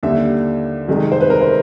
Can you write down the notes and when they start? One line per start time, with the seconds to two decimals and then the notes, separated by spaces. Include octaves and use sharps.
0.03 D#2 D3 G3 E5
0.88 C2 C3 D#3 G#3
1.12 C5
1.21 B4
1.30 A#4
1.41 C5